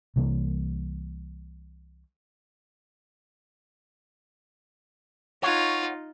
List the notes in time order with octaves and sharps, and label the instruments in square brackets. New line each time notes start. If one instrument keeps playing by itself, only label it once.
[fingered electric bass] C2 C3 E3 A#3
[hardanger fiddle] D#4 F4 [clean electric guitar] C#5 F#5